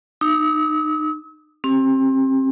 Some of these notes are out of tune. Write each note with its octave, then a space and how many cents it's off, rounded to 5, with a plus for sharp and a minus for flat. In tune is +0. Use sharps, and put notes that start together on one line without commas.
D#4 -25 E6 -45
C4 +30 G4 +0